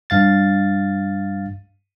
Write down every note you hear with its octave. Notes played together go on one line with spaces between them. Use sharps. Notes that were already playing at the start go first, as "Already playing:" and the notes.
G2 F5 A6